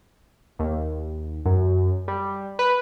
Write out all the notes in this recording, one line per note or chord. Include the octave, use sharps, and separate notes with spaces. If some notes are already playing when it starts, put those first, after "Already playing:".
D#2
F#2
G3
B4